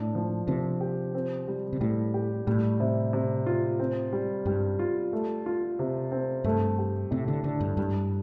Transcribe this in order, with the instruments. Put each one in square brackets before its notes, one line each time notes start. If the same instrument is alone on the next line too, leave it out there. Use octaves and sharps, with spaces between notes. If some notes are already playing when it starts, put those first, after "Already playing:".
Already playing: [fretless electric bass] A2 [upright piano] D4
[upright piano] F3
[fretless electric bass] C3 [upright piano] F3
[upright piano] G4
C4
G3
[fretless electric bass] C3
[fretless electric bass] A2 [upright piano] G3
[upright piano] G4
[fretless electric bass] A2 [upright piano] G3
[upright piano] C3
C3
F4
C4
G3
[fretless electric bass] G2 [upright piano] G3
[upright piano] F4
A3
F4
C3
C4
[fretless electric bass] G2 [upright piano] A3
[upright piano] G4
[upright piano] A2 [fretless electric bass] C3
[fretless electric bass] D3
[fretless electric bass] D3 [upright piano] D4
[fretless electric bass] G2
[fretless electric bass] G2 [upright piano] G3